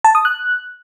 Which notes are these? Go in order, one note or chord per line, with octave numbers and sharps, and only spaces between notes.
A5
D#6
F#6